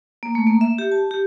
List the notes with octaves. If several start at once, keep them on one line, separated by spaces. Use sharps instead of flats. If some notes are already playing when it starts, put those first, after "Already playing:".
A#3
A3
A#3
E5
G4
A5
G4